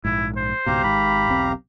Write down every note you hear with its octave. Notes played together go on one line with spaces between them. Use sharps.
A#1 G#2 E4
C5
C#2 G#2 B2 G4 F5 A#5
G#1 G#2 B5
E1 B1 C4